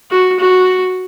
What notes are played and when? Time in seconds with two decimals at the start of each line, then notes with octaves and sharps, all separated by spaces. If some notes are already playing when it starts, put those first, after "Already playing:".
0.11 F#4
0.40 F#4